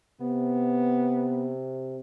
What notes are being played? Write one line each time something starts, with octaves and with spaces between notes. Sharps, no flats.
C3 B3